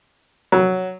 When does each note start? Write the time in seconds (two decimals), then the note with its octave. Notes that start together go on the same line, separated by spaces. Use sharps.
0.52 F#3